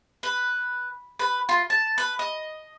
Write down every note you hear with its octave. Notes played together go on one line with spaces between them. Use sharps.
B4
B4
F4
A5
B4
D#5